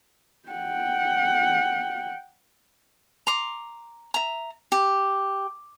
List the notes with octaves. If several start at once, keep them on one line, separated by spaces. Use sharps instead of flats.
F#5 G5
A#5 C6 D6
E5 A#5
G4